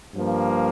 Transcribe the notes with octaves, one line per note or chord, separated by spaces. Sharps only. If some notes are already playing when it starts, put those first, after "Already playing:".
G2 F3 A#3